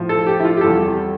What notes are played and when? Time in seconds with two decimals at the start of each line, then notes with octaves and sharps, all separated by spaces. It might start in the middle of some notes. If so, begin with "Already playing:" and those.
Already playing: A2 F3
0.09 A4
0.26 G4
0.40 E4
0.44 F4
0.57 G4
0.61 E2 C3 G3 A4